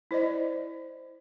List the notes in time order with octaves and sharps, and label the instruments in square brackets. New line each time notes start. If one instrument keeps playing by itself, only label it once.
[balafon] E4 C5 D5 D#5